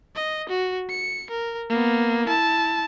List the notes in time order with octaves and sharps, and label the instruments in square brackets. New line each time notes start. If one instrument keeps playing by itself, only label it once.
[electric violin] D#5
F#4
C#7
A#4
A#3 B3
E4 A5